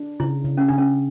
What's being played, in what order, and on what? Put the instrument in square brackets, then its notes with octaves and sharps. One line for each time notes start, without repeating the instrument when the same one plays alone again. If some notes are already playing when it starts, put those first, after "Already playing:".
Already playing: [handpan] D4
[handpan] C#3 [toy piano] E4
[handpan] C#3
[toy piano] C#4
[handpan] C#3 [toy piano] D4
[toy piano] C#4